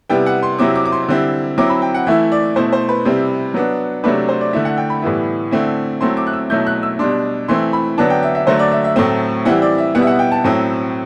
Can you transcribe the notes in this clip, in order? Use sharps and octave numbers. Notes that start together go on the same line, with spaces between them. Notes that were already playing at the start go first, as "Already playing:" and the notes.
C3 G3 B3 E4 G5
F#5
C6
C3 F#3 C4 E4 D6
D6
D6
C6
D3 G3 C4 E4
F#3 C4 E4 D6
B5
G5
F#5
E3 A3 E4 E5
D5
B2 A3 E4 C5
C5
B4
C3 G3 C4 E4
F#3 B3 D4
C3 F#3 A3 D4 B4
C5
D5
D3 A3 E4 E5
F#5
G5
B5
A2 E3 G3 B3 E4
D3 A3 C4 E4
F#3 A3 C4 E4 C6
D6
F#6
E6
B2 F#3 A3 E4 G6
F#6
E6
B2 G3 D4 C6
E3 A3 C4 E4 C6
B5
D3 F#3 B3 D4 A5
G5
E5
E5
D3 F#3 A3 C5
D5
E5
E5
A2 F#3 A3 C4
E3 G3 C4 E4 F#5
D5
E5
B2 G3 B3 E4 F#5
E5
F#5
G5
A5
A2 F#3 C4 E4